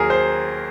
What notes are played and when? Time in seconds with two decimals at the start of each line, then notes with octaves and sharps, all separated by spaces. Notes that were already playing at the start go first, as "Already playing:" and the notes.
Already playing: D#2 D#3 F#3 G#4 A#4
0.10 C5